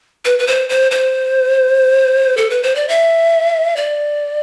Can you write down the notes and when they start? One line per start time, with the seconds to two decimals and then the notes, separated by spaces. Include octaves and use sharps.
0.25 B4
0.39 B4
0.47 C5
0.69 C5
0.91 C5
2.37 A4
2.50 B4
2.63 C5
2.75 D5
2.89 E5
3.76 D5